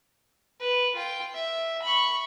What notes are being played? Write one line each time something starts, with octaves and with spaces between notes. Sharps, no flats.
B4
F4 G5
E5
B5 C#6